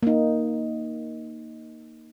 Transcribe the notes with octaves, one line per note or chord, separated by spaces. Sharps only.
A#3 D#4